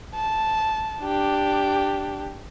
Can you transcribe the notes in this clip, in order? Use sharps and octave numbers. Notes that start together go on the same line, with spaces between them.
A5
D4 G4